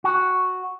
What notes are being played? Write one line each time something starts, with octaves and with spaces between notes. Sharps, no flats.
F#4